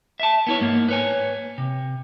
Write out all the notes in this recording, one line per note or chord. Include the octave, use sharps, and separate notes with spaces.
E5 A5
B3 E4 C#5
G#2 A#3
B4 C#5 G#5
C3